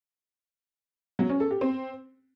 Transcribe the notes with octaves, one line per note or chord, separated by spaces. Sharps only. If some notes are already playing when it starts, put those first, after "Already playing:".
F#3
C#4
A4
G4
C4